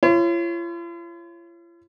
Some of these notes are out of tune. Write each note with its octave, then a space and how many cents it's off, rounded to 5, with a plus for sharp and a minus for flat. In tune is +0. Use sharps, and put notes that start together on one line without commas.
F4 -45 C#5 -20